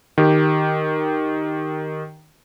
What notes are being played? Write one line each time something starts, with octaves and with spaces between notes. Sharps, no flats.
D#3 G4